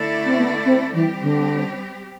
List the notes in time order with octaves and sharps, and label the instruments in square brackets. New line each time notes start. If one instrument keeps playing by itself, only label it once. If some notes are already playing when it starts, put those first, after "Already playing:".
Already playing: [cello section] D3 A3 E4 A4 D5
[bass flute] C4
B3
C4
[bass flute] E3 [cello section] G3 C4 G4
[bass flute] D3